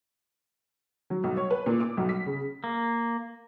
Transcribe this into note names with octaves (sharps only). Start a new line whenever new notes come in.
F#3
B1
C#5
B4
A#2
D6
B1
B6
C#3
A#3